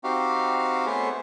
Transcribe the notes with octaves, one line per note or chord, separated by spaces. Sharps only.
C4 D#4 F#4 G4 F5
A3 B3 G#4 C5 C#5